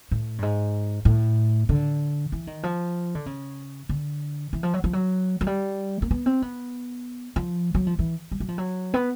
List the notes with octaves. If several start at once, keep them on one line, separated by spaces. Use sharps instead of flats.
A2
G2
G#2
A2
D3
E3
D#3
F3
D3
C#3
D3
E3
F3
F#3
F3
F#3
F#3
G3
A#3
B3
C4
B3
F3
F#3
F3
E3
G3
F#3
F3
F#3
B3